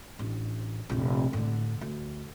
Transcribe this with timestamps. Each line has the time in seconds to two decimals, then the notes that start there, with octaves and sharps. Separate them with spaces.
0.19 A1 D4
0.89 F1 A#1
1.33 A2 D3
1.81 D2